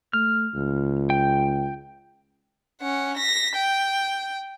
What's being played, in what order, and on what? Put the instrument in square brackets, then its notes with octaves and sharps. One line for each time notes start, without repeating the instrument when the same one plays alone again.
[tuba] A3 [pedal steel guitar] F6
[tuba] C#2
[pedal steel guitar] G5
[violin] C#4 F#5
A#6 B6
G5